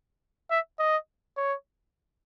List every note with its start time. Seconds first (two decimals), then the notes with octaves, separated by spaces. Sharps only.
0.51 E5
0.79 D#5
1.37 C#5